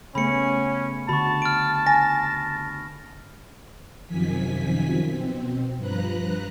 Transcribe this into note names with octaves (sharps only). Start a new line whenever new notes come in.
C#3 A3 B3 C#4 B5 C#7
D3 F#4 A5 B5 C#6
F6 D7
G#5 A#6
F#2 C3 D#3 F3 G#5 B6
B2 C4
G2 F3 B4 A#5 F#6